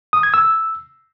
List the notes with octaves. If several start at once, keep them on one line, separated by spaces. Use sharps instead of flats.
D#6
G#6
E6